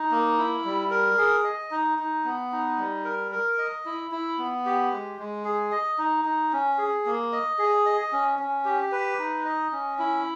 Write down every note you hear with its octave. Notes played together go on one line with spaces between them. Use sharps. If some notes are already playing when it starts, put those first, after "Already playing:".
Already playing: D#4
A#3
E4
G3
A#4
G#4
D#5
D#4
D#4
B3
D#4
G3
A#4
A#4
D#5
E4
E4
B3
G4
G#3
G#3
G#4
D#5
D#4
D#4
C#4
G#4
A#3
D#5
G#4
D#5
C#4
C#4
G4
B4
D#4
D#5
C#4
E4